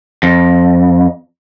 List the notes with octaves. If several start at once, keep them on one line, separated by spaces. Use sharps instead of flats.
F2